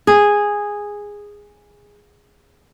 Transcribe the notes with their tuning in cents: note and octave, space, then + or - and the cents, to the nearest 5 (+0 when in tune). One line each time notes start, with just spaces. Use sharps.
G#4 -10